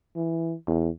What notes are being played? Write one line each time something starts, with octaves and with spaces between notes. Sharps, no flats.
E3
E2